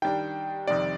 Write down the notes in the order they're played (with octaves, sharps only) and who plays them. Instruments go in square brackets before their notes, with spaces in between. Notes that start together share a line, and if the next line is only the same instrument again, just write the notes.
[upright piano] D#3 G3 D4 [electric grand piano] G5
[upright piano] F2 C3 D#3 G3 [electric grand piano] D5